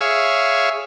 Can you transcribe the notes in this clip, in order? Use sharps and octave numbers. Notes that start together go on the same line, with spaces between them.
G#4 C#5 E5 F5